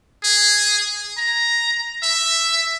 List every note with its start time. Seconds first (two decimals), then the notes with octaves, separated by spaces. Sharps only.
0.24 G#4
1.18 A#5
2.03 E5